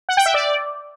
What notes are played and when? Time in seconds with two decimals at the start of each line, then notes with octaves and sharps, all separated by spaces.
0.09 F#5
0.17 G5
0.26 E5
0.34 D5